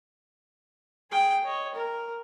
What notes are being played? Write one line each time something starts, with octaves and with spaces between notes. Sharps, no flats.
G#4 G5
C#5 D#5
A#4